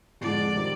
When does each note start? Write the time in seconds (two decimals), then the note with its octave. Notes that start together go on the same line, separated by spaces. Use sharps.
0.21 F2 D3 F3 G#3 D5
0.54 C3 D#3 G3 C4